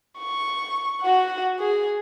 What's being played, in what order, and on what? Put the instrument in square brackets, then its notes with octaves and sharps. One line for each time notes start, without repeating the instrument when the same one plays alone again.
[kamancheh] C#6
F#4 F#5
G#4